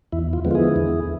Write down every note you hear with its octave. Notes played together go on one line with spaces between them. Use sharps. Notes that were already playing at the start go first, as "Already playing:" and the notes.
E2 E4
F4
D3 F3 G#3 B3
F4
E4 G#4
E2